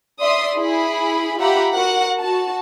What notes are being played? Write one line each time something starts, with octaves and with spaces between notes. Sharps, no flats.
D5 E5 C6 D#6
E4 G#4 B5
F4 G4 E5 F#5 A#5 B5
F#4 A#4 F#5
F#4 A5